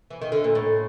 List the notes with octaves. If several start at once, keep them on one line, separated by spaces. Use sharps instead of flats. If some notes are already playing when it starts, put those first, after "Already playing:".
E3
D#3
D3
A#2
A2